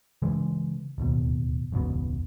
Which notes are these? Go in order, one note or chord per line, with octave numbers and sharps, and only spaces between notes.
C#3 E3 G#3
D1 D#2 B2
E1 C#2 G#2 B2